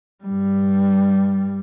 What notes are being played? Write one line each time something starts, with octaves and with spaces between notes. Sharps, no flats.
G2 G3